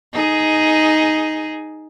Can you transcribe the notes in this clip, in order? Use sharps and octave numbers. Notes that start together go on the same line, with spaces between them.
D#4 G#4